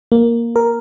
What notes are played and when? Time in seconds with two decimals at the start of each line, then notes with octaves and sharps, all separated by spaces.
0.12 A#3
0.56 A#4